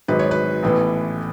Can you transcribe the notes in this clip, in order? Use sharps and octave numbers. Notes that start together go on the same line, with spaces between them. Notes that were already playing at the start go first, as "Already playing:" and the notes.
G#1 G#2 F#3 B4
C#5
B4
A1 A2 E3 B3